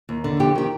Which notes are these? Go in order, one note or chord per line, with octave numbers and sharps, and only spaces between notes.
D#2
D3
F2 G4
D#3 G4